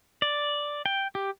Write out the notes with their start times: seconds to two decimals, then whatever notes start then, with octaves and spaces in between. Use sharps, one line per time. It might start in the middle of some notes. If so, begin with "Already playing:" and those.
0.22 D5
0.86 G5
1.15 G4